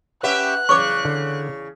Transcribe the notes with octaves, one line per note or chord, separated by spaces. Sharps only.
C#4 G4 B4 E5 F#5 F#6
E2 C#3 C#5 C#6 D6
D3